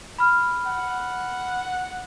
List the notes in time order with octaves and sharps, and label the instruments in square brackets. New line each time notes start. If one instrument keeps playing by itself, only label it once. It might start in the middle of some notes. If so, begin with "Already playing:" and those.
[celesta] B5 F6
[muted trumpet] F#5